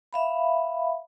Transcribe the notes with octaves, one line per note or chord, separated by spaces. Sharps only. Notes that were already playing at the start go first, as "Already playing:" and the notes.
E5 F5 B5